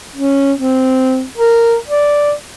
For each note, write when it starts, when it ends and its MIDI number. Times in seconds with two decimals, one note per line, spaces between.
0.16 0.53 61
0.59 1.25 60
1.38 1.75 70
1.87 2.33 74